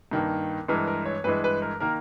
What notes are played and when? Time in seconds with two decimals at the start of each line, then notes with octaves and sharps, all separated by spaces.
0.11 G2 D#3 A#3
0.68 G2 E3 G#3 A#4
0.87 A#4
1.06 C#5
1.24 G2 E3 G#3 B4
1.44 B4
1.62 A#4
1.80 D#3 A#3 A#4